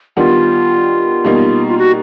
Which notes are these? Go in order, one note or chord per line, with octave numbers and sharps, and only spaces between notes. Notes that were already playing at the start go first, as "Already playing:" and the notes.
D#3 G3 B3 D4 F4
B2 G3 A#3 D#4
F4
F#4